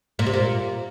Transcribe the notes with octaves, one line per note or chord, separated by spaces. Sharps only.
A#2
C3
A#2